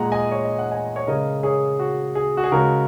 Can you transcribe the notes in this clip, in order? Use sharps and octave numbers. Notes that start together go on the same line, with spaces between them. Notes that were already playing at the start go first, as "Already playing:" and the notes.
Already playing: A#2 G#3 F#5 A#5
D#5 G#5
C#5
D#5
F#5
D#5 G#5
C#5
C#3 G#3 A#4 D#5
G#4 C#5
F#4
G#4
F#4
G#4
C#3 G#3 F#4 A#4